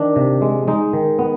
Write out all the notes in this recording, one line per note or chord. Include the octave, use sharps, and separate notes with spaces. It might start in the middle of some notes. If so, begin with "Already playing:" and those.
Already playing: D#3 D4
C3
G#3
G#3 D#4
D#3
B3